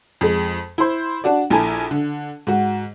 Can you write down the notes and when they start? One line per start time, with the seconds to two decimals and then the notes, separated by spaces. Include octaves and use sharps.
0.21 F2 G#3
0.78 E4 C5
1.24 D4 F#4 D5
1.50 A#1 E4 A4 G#5 A#5
1.91 D3
2.47 G#2 F#4